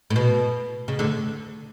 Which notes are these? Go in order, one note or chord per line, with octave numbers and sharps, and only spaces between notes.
A2
B2
C#3
D2 D3